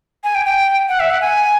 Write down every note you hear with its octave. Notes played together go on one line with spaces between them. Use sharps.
G#5
G5
G5
F#5
E5
F#5
G#5